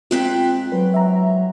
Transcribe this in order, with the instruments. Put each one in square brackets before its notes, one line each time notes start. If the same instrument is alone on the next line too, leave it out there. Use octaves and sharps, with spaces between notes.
[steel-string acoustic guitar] G#2 C4 G5 [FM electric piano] F4 F#6 B6
[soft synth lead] F#3 [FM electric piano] B4
[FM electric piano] E5 A#5